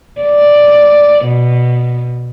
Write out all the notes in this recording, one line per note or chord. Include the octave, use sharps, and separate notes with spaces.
D5
B2